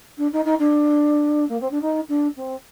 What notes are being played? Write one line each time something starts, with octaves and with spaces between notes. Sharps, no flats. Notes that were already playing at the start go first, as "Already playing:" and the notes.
D4
D#4
D#4
D4
A#3
C4
D4
D#4
D4
C4